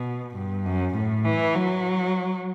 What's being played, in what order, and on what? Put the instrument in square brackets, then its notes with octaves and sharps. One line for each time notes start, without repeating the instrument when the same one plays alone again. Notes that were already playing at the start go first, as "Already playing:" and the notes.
Already playing: [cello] B2
G2
F#2
A2
E3
F#3